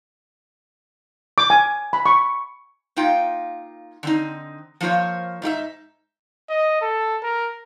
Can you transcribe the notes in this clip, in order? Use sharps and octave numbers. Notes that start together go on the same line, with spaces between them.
D6
G#5
B5
C#6
A#3 D#4 F4 G5
D3 C4 D#4
F3 A#3 F4 C5 C#5
G#2 D#4 G4 E5
D#5
A4
A#4